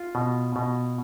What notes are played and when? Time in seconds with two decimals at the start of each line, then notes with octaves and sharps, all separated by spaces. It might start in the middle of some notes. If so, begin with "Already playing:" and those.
Already playing: F4
0.15 B2
0.56 B2